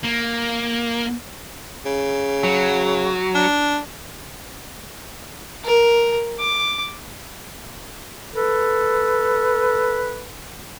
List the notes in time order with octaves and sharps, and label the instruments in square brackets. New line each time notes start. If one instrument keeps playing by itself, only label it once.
[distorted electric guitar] A#3
[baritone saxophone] C#3
[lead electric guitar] F#3
[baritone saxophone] D4
[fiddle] A#4
D6
[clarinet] A4 [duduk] B4